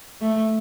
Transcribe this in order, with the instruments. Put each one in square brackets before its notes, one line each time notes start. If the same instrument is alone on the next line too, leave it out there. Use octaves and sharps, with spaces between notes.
[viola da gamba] A3